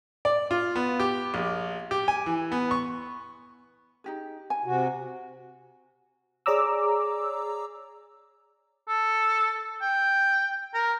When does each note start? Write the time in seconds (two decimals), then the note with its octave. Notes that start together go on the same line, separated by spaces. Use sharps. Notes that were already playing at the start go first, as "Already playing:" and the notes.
0.25 D5
0.51 F4
0.76 B3
1.00 G4
1.34 A#1
1.91 G4
2.08 G#5
2.26 E3
2.52 B3
2.71 C#6
4.04 D#4 G4 G#4
4.50 G#5
4.65 C3 F#4
6.46 G#4 C#5 D5 A#5 D6 E6
8.88 A4
9.81 G5
10.74 A#4